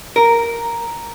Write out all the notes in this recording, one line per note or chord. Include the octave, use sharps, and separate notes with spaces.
A#4